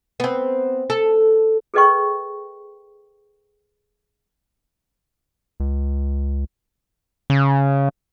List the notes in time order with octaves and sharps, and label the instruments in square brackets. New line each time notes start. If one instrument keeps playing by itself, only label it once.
[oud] B3 C4
A4
[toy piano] G#4 A4 B4 D#5 G5 C#6
[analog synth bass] C#2
[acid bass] C#3